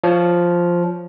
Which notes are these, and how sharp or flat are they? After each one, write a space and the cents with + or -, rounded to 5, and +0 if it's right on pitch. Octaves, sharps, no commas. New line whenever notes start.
F3 +0 C#5 +15